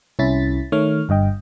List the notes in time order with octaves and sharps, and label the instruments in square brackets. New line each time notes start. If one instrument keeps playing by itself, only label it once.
[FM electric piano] C2 C#4 E4 A6 B6
D#3 A3 C#5 F6
G1 G2 D#5 G5